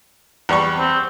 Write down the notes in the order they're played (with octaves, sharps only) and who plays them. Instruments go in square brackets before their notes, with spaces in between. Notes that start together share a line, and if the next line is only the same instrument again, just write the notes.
[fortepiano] E2 G3 C#6
[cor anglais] C4